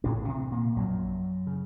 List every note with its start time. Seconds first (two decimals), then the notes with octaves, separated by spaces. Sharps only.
0.04 A1 A2 C#3 C#4
0.28 C3 C4
0.52 A#2 A#3
0.76 A#1 F#2 A#2 F#3
1.47 C#3